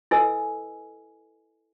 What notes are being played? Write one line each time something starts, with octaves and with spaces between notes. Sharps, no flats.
E4 A4 B4 D#5 G#5 E6